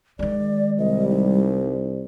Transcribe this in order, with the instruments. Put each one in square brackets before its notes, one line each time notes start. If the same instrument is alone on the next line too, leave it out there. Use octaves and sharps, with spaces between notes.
[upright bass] D#3 G#3 [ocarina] D5
[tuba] C2 [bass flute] G3 [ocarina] D#5
[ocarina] D#4